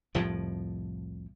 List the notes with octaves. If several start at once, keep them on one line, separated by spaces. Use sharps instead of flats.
C2 F2 A2 F3